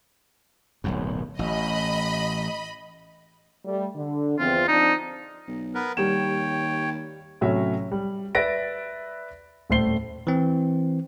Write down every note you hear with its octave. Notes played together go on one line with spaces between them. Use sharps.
D1 B1 F#2
A1 D#5 B5
G3 A3
D3
E2 F3 C4 F4
F3 C4 D4 D#4
B1
B3 A#4 B4
D#2 G3 C#5 G5 E7
A2 C3 F#3 C#4 E5
G3
B4 D5 E5 A6 A#6 D7
D#1 A2 A3 C5 C7 G7
E3 C4